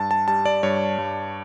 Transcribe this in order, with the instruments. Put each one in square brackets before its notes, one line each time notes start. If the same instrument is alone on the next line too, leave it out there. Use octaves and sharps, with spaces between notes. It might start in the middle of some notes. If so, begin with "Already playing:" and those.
Already playing: [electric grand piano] G2 A5
A5
G3 A5
D5
G2 C#5
G2